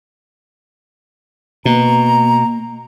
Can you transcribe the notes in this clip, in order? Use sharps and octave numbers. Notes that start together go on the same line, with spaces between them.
B2 A#3 A#5